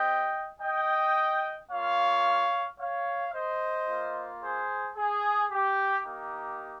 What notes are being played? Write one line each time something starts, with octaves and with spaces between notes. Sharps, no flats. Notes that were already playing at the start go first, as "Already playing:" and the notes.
Already playing: C4 G4 D#5 G5
D#5 G5
A#3 F4 C#5 F5
C#5 F5
C5 D#5
A#3 F4
G#4 C5
G#4
G4
A#3 D#4 G4